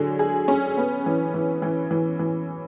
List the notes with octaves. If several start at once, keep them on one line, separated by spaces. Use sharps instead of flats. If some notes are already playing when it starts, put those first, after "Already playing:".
Already playing: D3 F#3 G#4
G#4
C#4
B3
E3
E3
E3
E3
E3